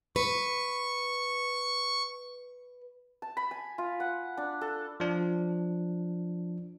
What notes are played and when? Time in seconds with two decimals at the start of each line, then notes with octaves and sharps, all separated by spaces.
0.16 B4 C#6
3.22 A5
3.37 B5
3.51 G#5
3.78 F4
4.00 F#5
4.37 D4
4.61 A4
5.00 F3 D4